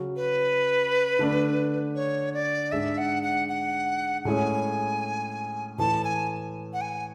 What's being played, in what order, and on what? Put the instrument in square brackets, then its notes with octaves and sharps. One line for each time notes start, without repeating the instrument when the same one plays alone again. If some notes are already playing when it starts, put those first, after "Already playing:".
Already playing: [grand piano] C#3 F#3 C#4 F#4
[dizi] B4
[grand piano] D3 A3 D4
[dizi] C#5
D5
[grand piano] G#2 G#3 D4 [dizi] E5
[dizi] F#5
F#5
F#5
[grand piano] A2 G#3 C#4 E4 G#4 [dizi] G#5
[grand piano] A2 E3 A3 E4 [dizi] A5
[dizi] G#5
F#5
G#5